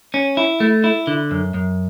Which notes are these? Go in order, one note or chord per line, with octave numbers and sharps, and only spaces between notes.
C#4
E4
A3
E4
D3
F#2
F#2